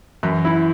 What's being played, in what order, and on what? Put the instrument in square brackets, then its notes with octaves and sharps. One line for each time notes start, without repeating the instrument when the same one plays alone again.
[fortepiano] F#2 [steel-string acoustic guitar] E3
[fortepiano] E4